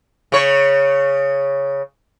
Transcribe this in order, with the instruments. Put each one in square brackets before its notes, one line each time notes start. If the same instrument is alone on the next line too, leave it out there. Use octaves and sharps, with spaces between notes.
[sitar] C#3 C#5